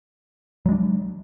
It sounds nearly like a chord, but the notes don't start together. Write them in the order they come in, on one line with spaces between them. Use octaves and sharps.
F#3 G#3 D4